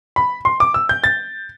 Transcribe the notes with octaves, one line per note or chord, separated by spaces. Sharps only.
B5
C6
D6
E6
G6
A6